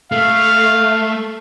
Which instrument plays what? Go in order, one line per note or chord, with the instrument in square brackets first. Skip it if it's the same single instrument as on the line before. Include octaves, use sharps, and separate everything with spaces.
[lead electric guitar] A3 [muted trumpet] F5